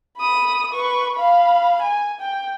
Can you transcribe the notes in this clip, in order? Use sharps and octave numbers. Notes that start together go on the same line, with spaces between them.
B5 D#6
B4 C#6
F5 B5
G#5
G5